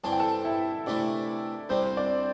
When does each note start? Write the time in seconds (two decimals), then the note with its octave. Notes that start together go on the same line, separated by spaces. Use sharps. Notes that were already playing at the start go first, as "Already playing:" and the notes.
0.04 G2 E3 C4 A5
0.12 G5
0.20 A4 A5
0.45 E4 E5
0.86 C3 E3 A3 D4 D5
1.69 C2 C3 G3 C4 C5
1.97 D4 D5